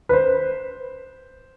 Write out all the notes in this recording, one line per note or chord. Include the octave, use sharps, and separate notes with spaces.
B4
C5